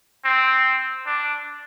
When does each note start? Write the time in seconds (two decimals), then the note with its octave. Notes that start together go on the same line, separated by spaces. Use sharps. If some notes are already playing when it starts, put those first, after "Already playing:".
0.25 C4
1.07 D4